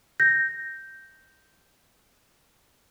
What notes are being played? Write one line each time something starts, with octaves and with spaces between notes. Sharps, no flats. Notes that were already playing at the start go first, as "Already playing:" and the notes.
G6 A#6